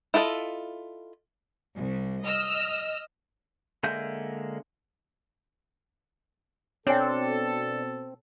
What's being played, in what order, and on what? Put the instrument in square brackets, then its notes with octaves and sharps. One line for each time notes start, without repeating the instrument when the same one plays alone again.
[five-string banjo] E4 F4 A4 B4 D#5
[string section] C2
D#5 E6 F6
[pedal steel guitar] D3 G#3 A#3 E5 G6
[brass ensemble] B2 A4 [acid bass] C4 [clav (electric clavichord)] D4 [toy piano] C#5 G5